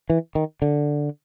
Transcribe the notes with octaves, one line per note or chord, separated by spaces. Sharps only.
E3
D#3
D3